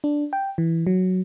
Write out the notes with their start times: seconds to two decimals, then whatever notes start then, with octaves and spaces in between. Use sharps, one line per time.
0.04 D4
0.33 G5
0.58 E3
0.87 F#3